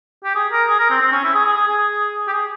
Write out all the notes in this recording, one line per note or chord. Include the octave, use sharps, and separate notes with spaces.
G4
G#4
A#4
G#4
A#4
C4
C4
C#4
E4
G#4
G#4
G#4
G#4
G4
G#4